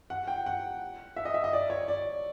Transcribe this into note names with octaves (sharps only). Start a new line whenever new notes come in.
F#5
G5
F#5
E5
D#5
E5
D#5
D5
C#5
D5